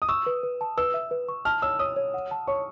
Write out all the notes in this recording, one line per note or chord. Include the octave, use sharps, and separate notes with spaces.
D#6
C#6 E6
B4
B4
A5
B4 E6
E5
B4
C#6
A5 F6
C#5 E6
C#5 D#6
C#5
F#5
A5
C#5 C#6